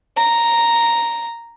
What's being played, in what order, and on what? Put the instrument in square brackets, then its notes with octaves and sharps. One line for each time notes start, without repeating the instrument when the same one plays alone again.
[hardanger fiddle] A#5